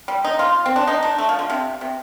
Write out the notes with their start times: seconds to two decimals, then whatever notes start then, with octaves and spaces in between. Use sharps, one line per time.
0.08 G3
0.25 D#4
0.39 F4
0.66 C4
0.76 D4
0.87 D#4
1.03 D4
1.18 A3
1.29 F3
1.39 D3
1.50 C3
1.81 C3